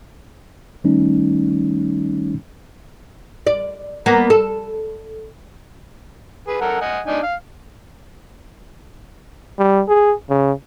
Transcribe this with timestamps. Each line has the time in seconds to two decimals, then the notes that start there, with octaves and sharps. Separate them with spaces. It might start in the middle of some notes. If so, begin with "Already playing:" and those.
0.84 D#3 G3 A3 C#4 D#4
3.47 D5
4.06 A#3 B3
4.30 A4
6.47 G#4 B4
6.61 A4 A#4 F#5
6.81 D#5 F#5 G#5
7.07 D4 D#4 G#5
7.23 F5
9.59 G3
9.88 G#4
10.30 C#3